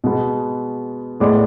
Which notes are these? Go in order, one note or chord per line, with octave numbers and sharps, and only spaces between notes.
B2 G#3 B3
A2 G#3 B3 D5 D6